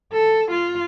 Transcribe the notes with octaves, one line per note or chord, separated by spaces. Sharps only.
A4
F4